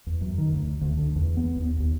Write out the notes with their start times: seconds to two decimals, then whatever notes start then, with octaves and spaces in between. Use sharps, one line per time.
0.07 E2
0.21 F#2
0.38 D#3
0.52 D2
0.81 D2
0.97 D3
1.16 E2
1.37 B3
1.56 D#2
1.80 D#2